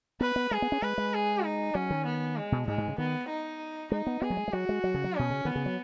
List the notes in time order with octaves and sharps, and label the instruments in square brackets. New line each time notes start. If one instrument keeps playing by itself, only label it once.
[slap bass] B3 [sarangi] B4
[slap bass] B3
[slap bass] G#3 [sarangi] G#4
[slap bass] B3
C#4
[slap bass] G#3 [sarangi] B4
[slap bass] G#3
[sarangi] G#4
D#4
[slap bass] F#3 [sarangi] C#4
[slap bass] D#3
[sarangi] B3
G#3
[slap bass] B2
[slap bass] G#2 [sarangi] G#3
[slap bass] G#2
C#3
[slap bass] D#3 [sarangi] B3
[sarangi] D#4
[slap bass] G#3 [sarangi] D#4
[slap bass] B3
[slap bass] B3 [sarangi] G#4
[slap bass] F#3
G#3
G#3
[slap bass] F#3 [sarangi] F#4
[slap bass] G#3
F#3
C#3
F#3
[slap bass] B2 [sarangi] C#4
[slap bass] C#3
[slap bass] D#3 [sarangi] B3
[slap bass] C#3
F#3